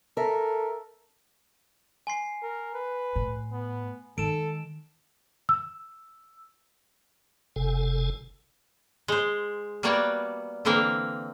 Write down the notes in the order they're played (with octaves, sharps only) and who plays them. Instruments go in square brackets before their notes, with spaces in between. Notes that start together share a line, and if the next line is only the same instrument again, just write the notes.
[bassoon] A4 [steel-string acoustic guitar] A#4 E5
[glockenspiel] G#5 C6 C7
[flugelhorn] A#4
B4
[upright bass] A2
[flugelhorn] B3
[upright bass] D#3 G#3 [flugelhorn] A4 [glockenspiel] D7 E7
[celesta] E6
[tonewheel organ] F#1 C3 A4 G#5
[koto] G#3 C5
G3 A#3 B3 F#4 C#5 D5
D3 E3 A#3 C4 A#4